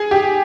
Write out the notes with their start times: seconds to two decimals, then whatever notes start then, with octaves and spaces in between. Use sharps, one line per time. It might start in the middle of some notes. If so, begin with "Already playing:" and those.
Already playing: G#4
0.11 G4